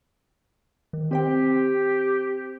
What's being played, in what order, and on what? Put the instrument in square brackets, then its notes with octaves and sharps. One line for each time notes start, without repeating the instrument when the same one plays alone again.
[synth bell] D#3
[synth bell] C4 C5 G5 [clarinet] G4